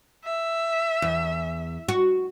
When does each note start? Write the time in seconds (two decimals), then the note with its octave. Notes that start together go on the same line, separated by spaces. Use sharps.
0.25 E5
1.02 E2
1.89 F#4